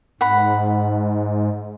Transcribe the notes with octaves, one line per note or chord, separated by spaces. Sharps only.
G#2 F#5 B5